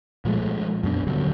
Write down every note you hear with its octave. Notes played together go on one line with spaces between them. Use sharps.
A#2 F3 G#3 A3
F#2 B2 D4
D#1 D3 F#3 G3